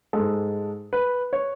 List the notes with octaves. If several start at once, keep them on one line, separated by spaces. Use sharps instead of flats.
G#2 G#3 A4
B4
C#5